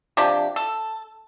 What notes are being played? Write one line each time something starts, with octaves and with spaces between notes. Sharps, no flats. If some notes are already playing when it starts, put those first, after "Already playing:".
C3 F3 D4 G4
A4